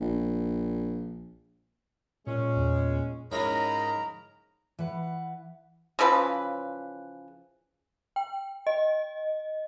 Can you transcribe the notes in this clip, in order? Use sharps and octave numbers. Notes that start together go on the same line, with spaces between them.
A#1
A#2 G#3 C#4
E2
G#2 C#4 E4 F4 A#4 D#5 A#5 B5
E3 B4 F#5
C#3 E3 F3 B4
G5
D#5